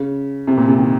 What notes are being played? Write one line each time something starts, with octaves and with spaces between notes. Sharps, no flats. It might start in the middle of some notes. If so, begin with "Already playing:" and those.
Already playing: C#3
C3
A#2
C3
D#3